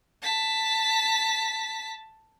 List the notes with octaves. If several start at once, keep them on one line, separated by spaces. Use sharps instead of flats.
A5 B6